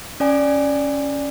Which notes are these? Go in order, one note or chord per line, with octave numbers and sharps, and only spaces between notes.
C#4 D5 G#5